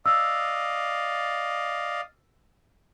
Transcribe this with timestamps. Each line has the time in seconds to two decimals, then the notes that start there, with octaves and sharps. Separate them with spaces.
0.06 D5 D#5 F5 E6